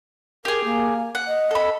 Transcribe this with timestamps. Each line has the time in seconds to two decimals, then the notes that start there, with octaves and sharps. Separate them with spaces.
0.45 G4 G#4 A#4
0.64 A#3
1.15 F#5
1.27 D#5
1.51 A4 B5